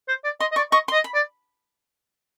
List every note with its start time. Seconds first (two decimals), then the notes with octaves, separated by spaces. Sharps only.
0.08 C5
0.24 D5
0.40 D#5 C6
0.52 D#5
0.56 D5 C#6
0.72 D#5 C#6
0.88 C6
0.93 D#5
1.04 B5
1.14 D5